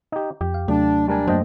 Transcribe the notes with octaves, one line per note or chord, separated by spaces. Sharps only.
D#4 G4
F2 G4
F5
D#2 C3 F#3 A3 D4
G3 D4 A#4 G#5
F#2 F#3 A3 A#3 C5 D#5 G5